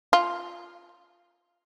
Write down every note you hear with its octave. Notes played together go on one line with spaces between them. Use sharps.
F4